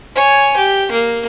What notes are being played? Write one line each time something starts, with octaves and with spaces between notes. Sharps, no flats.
C#5 G#5
G4
A#3